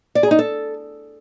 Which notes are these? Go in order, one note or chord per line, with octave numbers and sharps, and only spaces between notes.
D5
G#4
D#4
A4